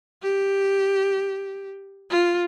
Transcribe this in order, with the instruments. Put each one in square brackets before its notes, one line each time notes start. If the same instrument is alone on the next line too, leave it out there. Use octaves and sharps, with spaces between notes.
[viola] G4
F4